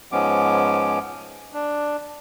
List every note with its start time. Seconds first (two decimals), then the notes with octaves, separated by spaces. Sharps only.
0.12 G#2 F3 G#3 B3 C#4 D6
1.53 D4